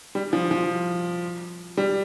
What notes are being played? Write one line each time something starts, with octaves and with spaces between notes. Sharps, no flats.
G3
F3
F3
G3